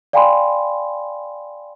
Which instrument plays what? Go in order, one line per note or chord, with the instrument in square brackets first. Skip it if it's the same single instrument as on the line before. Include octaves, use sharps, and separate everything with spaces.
[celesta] D5 F5 G5 G#5 B5 C6